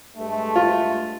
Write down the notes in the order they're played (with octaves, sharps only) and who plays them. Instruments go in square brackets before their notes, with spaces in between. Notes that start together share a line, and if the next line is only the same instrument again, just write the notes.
[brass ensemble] G2 G#3 A3
[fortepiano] F4